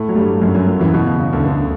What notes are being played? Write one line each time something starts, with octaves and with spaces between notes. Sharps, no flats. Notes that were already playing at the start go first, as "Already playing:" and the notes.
Already playing: A2 A3
F#3
G2 G3
F#2 F#3
F#2 F#3
F#2 F#3
E2 E3
B2
C#3
C#3
D2 D3
D2 D3